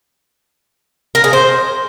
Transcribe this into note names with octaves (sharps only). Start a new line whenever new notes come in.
A#4
G#4
C5